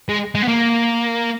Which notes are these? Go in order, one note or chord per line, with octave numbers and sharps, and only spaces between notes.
G#3
G#3
B3
A#3